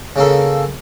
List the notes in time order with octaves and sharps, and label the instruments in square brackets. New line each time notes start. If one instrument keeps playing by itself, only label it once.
[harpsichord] C#3 A#3 A4